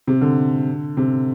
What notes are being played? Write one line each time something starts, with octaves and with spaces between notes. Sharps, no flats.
C3
D3
C3